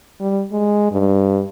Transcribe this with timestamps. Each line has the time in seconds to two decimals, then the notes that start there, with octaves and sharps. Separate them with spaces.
0.21 G3
0.52 G#3
0.92 G2